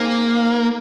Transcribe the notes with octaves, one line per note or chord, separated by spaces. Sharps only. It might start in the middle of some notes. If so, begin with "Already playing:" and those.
Already playing: A#3 C4 D#4 G#4 C5 G#5